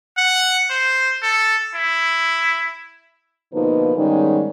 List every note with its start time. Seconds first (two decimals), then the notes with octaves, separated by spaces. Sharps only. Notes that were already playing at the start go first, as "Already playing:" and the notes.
0.17 F#5
0.70 C5
1.23 A4
1.75 E4
3.54 B2 D3 F3 A#3 D#4 B4
3.96 G#2 D#3 G3 G#3 B3 C#4